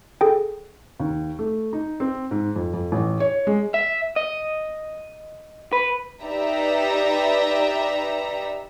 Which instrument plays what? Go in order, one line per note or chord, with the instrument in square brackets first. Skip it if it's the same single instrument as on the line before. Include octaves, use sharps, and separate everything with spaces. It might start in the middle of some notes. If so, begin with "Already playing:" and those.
[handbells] G#4 A4 G5
[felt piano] D#2
A3
D#4
C4
G#2
F2
F2
A1
C#5
G#3
[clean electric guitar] E5
D#5
B4
[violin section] D#4 G4 B4 D5 E5 A#5